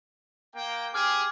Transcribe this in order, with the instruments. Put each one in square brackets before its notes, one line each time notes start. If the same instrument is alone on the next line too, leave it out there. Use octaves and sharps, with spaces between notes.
[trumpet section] A#3 G5
[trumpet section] C4 G4 G#4 [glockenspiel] D6 F6 G#6